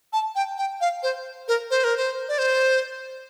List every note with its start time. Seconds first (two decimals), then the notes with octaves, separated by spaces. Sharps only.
0.13 A5
0.36 G5
0.58 G5
0.81 F5
1.03 C5
1.48 A#4
1.70 C5
1.84 A#4
1.97 C5
2.29 D5
2.38 C5